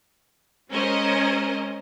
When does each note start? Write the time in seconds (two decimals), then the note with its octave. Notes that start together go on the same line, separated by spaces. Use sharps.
0.72 G#3 C#4 A#4 C5 D#5